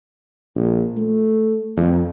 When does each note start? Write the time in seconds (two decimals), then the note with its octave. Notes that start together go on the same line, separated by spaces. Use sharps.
0.56 A#1
0.97 A3
1.77 F2